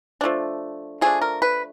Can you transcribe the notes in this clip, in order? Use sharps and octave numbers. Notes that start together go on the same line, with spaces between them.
F3 A3 D4
F3 A3 D4 G#4
A#4
B4